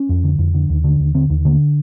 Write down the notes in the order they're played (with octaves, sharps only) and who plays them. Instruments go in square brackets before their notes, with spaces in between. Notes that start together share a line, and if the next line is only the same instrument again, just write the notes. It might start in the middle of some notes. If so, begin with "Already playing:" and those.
Already playing: [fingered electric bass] C#4
F2
D3
F2
D3
D#2
D3
D#2
D3 C4
D#2
D3 A#3